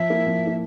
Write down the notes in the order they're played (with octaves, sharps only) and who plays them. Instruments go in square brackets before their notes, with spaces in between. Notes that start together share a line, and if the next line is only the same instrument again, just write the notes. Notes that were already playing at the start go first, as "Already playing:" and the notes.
Already playing: [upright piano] F3 [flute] E5
[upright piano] A#3 E4
F3
A#3 E4